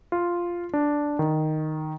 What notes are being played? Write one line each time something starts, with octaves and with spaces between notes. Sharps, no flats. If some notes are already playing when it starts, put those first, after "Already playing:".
F4
D4
D#3